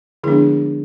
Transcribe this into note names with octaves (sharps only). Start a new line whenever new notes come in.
D3 F3 G#3 B3 D4 E4 G#4